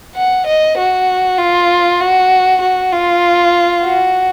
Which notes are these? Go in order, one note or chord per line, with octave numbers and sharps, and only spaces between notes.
F#5
D#5
F#4
F4
F#4
F#4
F4
F#4